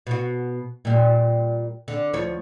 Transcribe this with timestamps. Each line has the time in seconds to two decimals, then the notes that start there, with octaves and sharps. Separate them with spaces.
0.07 B2 F#4
0.85 A#2 G3
1.88 D3
2.13 D2 F3 C#5